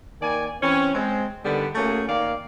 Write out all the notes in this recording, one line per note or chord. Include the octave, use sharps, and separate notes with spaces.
D#3 A#3 D5 G#5
E3 C4 C#4
G#3 C4
D3 D#3 G3 B3
A3 A#3 C#4 F#4 G#4
D#3 A#3 D5 F5